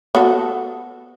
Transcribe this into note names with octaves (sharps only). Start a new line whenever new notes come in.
B3 F#4 A4